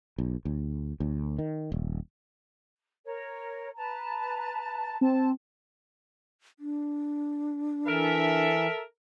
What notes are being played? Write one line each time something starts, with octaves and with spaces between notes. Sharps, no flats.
B1
D2
D2
D#3
D#1
A#4 C#5
B4 A5 A#5
C4 A5
D4
E3 A4 A#4 E5